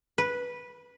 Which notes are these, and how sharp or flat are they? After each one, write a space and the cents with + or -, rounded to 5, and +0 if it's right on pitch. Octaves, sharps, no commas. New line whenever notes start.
B4 -10